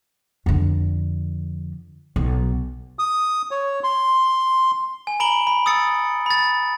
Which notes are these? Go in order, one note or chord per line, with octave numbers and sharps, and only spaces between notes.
F2 D3
B1
D#6
C#5
C6
G#5
A#5 B5 D7 F#7 G7
B5
D#6 E6 A6 C#7
B5 A6